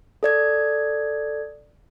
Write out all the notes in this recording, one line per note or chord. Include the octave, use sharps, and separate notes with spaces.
A4 D5 G#6